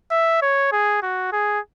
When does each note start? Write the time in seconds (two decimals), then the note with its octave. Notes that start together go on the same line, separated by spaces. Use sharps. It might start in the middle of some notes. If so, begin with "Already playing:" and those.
0.11 E5
0.42 C#5
0.72 G#4
1.02 F#4
1.32 G#4